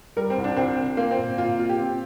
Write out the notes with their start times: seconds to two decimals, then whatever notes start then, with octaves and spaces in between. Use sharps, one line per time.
0.17 G3 A#4
0.30 C4
0.37 C2
0.44 D4
0.57 C2 C4
0.77 C3
0.97 A#3 F4
1.11 C4
1.18 A#2
1.38 A#2 F4
1.58 A#3 F4
1.69 G4
1.79 C4